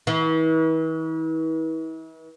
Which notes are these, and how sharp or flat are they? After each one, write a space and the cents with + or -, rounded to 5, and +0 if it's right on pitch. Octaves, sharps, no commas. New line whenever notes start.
E3 -40